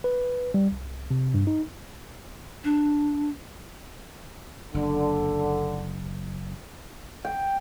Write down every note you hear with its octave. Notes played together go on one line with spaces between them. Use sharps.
B4
G3
C2
C3
G2
D#4
D4
F#1 D3
G5